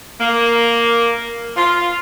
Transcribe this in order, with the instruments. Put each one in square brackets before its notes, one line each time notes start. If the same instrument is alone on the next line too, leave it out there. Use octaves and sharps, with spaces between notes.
[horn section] A#3
F4